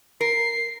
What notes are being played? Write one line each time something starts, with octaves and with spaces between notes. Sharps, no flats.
A#4 C7